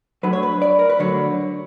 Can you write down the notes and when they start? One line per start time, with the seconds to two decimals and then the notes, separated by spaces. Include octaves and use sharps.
0.23 D2 D3 F#3 B4
0.33 C#5
0.43 B4
0.62 D5
0.79 A#4
0.90 B4
0.99 D2 D3 F#3 C#5